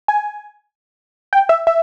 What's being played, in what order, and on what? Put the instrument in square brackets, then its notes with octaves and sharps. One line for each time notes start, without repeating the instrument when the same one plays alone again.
[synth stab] G#5
G5
E5
E5